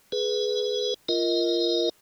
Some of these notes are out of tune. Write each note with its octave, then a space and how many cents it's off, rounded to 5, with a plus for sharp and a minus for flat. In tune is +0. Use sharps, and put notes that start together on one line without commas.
G#4 +15 B4 +0
F4 -20 A#4 +0 D#5 +20